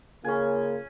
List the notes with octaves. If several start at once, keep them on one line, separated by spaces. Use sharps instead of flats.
C#3 A#3 C#4 F4 G#5